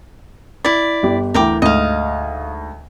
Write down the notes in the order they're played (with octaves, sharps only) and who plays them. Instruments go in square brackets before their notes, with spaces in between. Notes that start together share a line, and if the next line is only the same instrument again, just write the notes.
[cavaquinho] E4 D5 [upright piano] B6
[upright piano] G1 G4
[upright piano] D2 E3 [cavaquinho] A#4 G5 D6
[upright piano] D2 G#2 [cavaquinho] D#5 F5